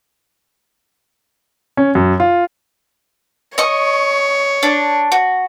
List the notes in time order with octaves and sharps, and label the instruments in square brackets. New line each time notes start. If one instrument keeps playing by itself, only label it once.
[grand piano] C#4
F#2
F4
[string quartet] C#5 [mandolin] D#5 C#6
[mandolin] D4
F#4